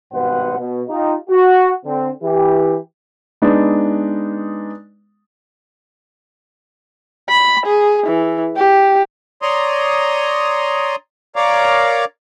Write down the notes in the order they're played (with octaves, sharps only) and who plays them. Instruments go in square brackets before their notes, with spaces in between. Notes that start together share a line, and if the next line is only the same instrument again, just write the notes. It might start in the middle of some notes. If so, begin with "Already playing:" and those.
[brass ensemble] G#1 G2 B2 B4 C5 F#5
B2
D#4 F4 G4
F#4
D3 C4
E3 G4
[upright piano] G#3 B3 D4 D#4
[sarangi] B5
G#4
E3
G4
[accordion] C#5 D5 A#5 C6 D#6
A#4 C#5 D5 F5 A#5 D6